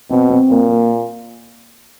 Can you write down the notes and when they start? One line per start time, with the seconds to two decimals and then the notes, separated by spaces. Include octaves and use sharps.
0.10 B2 C4
0.30 C4
0.50 A#2 A#3
0.70 A#3